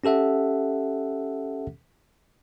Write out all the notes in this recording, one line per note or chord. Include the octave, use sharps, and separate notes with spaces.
C#4 G4 A4 E5 F#5